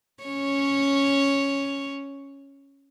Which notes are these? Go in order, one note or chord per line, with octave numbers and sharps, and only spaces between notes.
C#4 C#5